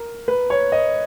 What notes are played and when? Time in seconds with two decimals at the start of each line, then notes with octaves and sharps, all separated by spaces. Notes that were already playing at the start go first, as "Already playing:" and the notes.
Already playing: A#4
0.28 B4
0.50 C#5
0.72 D#5